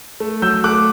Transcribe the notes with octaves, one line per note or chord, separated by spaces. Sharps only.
A3
F#3 E6 G6
A3 D6 F#6